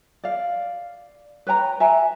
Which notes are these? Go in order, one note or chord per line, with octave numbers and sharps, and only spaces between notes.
D5 F5
B4 C#5 G5 A#5
E5 G#5 A#5